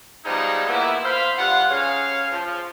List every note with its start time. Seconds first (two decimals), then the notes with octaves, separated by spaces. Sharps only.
0.25 F3 G3 G#3 B3 D#4
0.68 A#2 A#3 B3 E4
1.05 C5 F5 B5
1.38 G2 F4 F#5
1.70 C#3 G#4 C#5 F5
2.32 F3